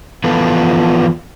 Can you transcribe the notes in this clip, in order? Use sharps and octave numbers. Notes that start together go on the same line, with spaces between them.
E3 F3 B3 F4 A4